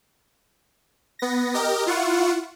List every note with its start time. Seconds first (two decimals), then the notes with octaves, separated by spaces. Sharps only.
1.19 B3 A#6
1.54 G4 A#4 D#5
1.86 E4 F4 F#5 C#6